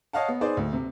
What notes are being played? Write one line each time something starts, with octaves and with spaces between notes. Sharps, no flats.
C#5 D#5 F5 F#5 A5
B3
D#4 G#4 B4 C5 D5
D2
C3